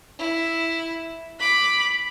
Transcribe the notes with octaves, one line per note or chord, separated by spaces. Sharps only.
E4
B5 D6